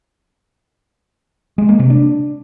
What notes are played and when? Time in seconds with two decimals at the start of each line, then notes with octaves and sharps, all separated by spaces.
1.58 G#3
1.69 A#3
1.79 C3
1.90 D4